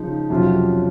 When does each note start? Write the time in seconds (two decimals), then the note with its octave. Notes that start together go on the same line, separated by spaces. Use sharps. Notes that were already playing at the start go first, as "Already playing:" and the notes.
Already playing: C#3 F3 D#4
0.30 F2 C3 F#3 C#4 F4